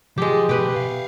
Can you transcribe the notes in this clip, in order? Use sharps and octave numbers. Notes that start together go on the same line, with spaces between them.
F3 G#3 G4
B2 G4 B4
E5 F5